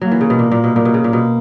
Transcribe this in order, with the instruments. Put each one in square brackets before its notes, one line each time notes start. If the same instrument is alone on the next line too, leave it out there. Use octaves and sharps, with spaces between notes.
[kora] F#3 [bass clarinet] A#3
[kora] E3
C#3
B2
A#2
A#2
B2
[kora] A#2 [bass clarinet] A#3
[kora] B2
C#3
A#2
B2